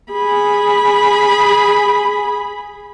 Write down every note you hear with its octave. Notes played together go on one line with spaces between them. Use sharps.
G#4 B5